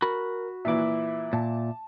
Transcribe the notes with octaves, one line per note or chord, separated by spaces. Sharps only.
F#4 A#4 B5
A#2 E3 E4 E5 D6
A#2 A5